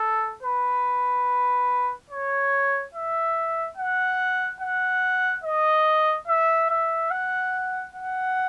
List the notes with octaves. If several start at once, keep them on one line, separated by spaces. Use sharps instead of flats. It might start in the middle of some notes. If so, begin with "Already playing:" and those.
Already playing: A4
B4
C#5
E5
F#5
F#5
D#5
E5
E5
F#5
F#5